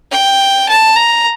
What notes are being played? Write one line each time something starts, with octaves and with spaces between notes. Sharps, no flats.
G5
A5
A#5